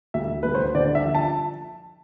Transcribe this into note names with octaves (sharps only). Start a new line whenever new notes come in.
D2 E5
D2 B4
C5
D3 D5
E5
F3
A5